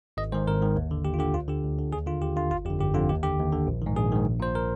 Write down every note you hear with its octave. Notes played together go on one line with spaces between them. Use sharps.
G#1 D#5
G#2 D#3 C5
G#1 A#4
G#2 D#3
D#2
D3
D#2 G4
F4
D3 G4
D2 F4
D3 G4
D2
D3
D#2 G#4
D3 F4
D#2 G4
D3 F4
G1 F4
F2 G4
D3
G1 G4
F2 D3 F4
D#2 G4
D3 G4
D#2
D3
A#1
G#2 D#3
A#1 G#4
G#2 D#3
A#1
A#2 C5
A#4